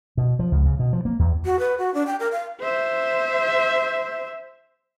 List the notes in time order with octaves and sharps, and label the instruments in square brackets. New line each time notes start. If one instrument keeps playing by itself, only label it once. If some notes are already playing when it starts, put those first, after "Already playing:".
[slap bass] B2
F3
C#2
C#3
B2
F3
A#3
E2
[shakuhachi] F#4
B4
F#4
D4
G5
A#4
F5
[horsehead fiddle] C5 E5